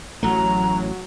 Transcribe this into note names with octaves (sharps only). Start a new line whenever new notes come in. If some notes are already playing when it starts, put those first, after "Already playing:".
A1 F#3 A3 A#5